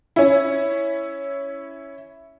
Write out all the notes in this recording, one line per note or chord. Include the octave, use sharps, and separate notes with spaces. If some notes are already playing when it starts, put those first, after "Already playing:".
C#4 E4